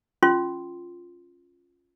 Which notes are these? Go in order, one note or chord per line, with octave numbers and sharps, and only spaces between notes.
C#4 F4 C6